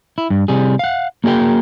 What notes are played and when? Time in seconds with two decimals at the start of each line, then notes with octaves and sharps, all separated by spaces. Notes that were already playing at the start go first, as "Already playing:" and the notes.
0.18 E4
0.30 G2
0.48 C3 G3 G#4
0.79 F5 F#5
1.24 A#3 F#4 G#4 A#4 G5